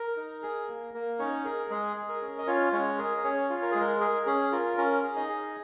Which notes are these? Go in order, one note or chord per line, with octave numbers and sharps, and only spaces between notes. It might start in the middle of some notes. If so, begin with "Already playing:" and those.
Already playing: A#4
D#4
G#4
A#3
A#3 A#4
C#4 D#4 C#5
G#4 A#4
G#3 G#4
G#4
A#4
C#4
D#5
C#4 F4 C#5
G#3 C#4 C#5
G#4 A#4
A#4
C#4 C#5
F4
A#4
G#3 G#4
A#4
G#4 A#4
C#4 G#4
F4 A#4
C#4 A#4
G#4
D#4 D#5
G#4